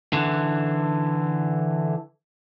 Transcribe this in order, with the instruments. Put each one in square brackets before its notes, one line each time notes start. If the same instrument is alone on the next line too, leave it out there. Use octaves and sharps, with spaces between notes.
[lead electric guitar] D3 E3